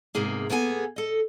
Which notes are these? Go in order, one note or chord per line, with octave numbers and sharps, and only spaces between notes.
E2 G#2 C3 A#3 G#4
A#3 B3 G#4 A4 G#5
A4 D#5